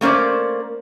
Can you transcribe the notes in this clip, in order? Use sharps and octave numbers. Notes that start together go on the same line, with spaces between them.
A3 A#3 C#4 C5 D5